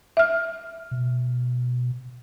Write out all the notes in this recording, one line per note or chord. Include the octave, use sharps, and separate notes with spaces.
E5 F6
B2